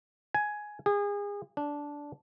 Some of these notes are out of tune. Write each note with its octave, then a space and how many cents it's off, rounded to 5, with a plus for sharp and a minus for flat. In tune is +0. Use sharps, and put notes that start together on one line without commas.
G#5 +10
G#4 -30
D4 -10